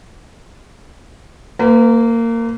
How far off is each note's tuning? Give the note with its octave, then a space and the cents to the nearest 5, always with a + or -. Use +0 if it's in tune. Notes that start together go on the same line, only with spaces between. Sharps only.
A#3 -20 B4 +35